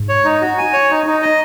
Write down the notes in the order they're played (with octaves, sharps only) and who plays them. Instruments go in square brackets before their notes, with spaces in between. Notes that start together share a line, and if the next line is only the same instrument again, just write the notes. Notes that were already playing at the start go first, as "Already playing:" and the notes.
Already playing: [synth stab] G#2
[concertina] C#5
D#4
F#4
G#5
C#5
D#4
D#4
D#5